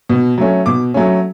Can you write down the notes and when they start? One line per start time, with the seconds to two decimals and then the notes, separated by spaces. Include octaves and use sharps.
0.09 B2
0.38 F#3 A3 C#4
0.66 B2 D6
0.94 F#3 A3 C#4